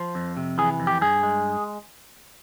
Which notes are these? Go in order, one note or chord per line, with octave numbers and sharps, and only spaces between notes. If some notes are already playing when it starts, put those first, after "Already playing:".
Already playing: F3 C5
F2
C3
E3 G#4
F2
G4
G2 G#4
G#3